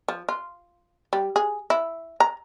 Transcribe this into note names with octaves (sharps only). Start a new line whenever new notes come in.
F3
F4
G3
G#4
E4
A#5